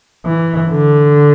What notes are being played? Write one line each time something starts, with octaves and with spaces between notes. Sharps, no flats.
E3
D3